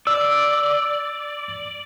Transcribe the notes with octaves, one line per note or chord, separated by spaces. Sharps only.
D5 E6